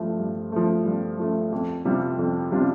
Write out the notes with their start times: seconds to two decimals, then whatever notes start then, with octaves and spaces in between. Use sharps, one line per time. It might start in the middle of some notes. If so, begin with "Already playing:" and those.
Already playing: G2 F3 A3
0.19 G2
0.52 F3 A3
0.86 G2
1.19 F3 A3
1.52 F2
1.85 C3 G3 D4 F4
2.19 F2
2.51 C3 G3 D4 F4